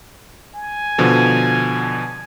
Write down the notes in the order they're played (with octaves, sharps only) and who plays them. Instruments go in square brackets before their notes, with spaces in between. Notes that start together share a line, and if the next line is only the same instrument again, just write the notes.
[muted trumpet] G#5
[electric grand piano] B2 D3 F3